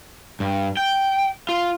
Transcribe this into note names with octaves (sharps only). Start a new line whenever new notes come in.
G2
G5
F4